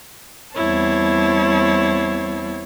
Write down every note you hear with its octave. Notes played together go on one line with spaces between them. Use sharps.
E2 G3 C4 E4 C#5 A5